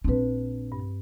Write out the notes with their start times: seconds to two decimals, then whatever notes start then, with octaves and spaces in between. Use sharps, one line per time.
0.04 A#1 C4 D4 B4
0.72 G2